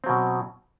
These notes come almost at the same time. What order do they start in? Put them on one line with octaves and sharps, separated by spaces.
C4 F#3 B2